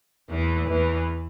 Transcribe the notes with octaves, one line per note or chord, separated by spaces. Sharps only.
E2 E3
E2 E3